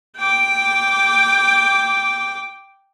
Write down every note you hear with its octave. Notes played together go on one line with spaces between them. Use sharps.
G5 D6